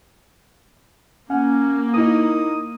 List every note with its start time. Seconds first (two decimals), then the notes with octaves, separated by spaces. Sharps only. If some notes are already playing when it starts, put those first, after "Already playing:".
1.30 A#3 C#4 F#5
1.94 D#4 E4 A#4 D#6